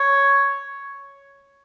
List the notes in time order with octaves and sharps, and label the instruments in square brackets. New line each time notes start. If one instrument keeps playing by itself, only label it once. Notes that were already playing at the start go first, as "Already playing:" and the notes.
Already playing: [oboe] C#5